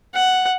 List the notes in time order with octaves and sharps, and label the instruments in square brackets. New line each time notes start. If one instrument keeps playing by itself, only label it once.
[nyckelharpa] F#5